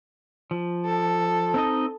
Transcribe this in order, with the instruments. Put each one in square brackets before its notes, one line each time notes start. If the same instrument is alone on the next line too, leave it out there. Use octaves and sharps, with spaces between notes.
[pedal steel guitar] F3
[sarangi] A4
[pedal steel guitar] C4 D#4 D#5